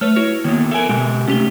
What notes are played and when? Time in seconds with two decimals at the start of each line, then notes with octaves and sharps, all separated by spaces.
0.01 A3 B4 C#5 F6
0.16 E4 F#4 C#5
0.44 D#3 A#3 B3
0.71 A4 A#4 E5 G#5
0.89 B2 G#3 G4
1.28 C3 A3 C#4 G4 G7